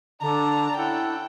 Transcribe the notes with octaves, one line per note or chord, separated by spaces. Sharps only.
D3 D4 D5 A5 A#5
C#4 E4 A4 F#5 G5